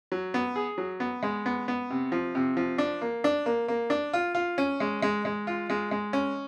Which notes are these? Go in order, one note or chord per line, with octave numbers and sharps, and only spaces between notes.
F#3
B3
G#4
F#3
B3
G#3
B3
B3
C3
F3
C3
F3
D4
A#3
D4
A#3
A#3
D4
F4
F4
C#4
G#3
G#3
G#3
F4
G#3
G#3
C#4